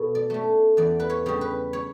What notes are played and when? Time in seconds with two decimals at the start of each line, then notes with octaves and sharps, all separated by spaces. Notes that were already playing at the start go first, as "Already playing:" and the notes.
Already playing: B2 A3 A4
0.15 D5
0.30 A3 C#4
0.77 E2 D5
1.00 B4
1.10 C#5
1.26 C#3 G3 C#4
1.41 B4
1.73 C#5